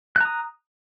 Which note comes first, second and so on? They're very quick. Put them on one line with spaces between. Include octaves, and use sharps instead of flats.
F#6 A#5 D#6